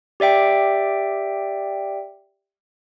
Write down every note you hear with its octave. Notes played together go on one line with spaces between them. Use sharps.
G4 D5 E5 G5